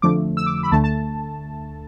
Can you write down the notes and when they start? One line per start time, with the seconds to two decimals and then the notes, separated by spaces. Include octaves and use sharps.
0.02 F2 D3 F3 A3 D6
0.37 E6
0.46 D6
0.63 B5
0.72 D2 D3 A3 A5
0.84 A5